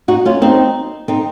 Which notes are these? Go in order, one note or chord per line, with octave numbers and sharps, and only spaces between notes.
D#4 F#4
C#4 F4
C4 D#4
C4 D#4